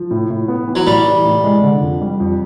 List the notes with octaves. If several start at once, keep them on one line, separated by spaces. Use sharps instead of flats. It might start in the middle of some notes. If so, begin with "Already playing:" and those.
Already playing: F3
A2
A2
B3
E3
F#3
A2 G3
E3
A2
G#3
D3
F2
G3
F2